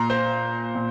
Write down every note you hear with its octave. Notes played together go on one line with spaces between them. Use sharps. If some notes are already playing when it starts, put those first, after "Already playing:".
Already playing: A#2 A#5 C6
C5
A#2